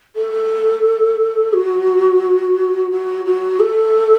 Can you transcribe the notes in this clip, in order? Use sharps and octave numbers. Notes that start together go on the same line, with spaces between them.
A4
F#4
F#4
F#4
A4